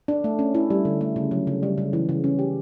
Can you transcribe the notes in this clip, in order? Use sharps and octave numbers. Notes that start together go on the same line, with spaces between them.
D4
A3
C#4
E4
G3
D3
A3
C#3
F#3
C#3
G3
C#3
E3
C#3
C#4
G4